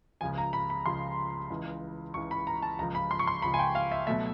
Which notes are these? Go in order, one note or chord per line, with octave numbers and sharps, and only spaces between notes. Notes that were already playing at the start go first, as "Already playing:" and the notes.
C#2 C#3 F3 G#5
A#5
B5
B5
C#2 C#3 F3 C6
C#2 C#3 E3
C#2 C#3 E3 C#6
B5
A#5
A5
C#2 C#3 F3 A#5
B5
C6
C#6
C6
C#2 C#3 F3 B5
G#5
G5
F5
E5
B2 F#3 A3 E5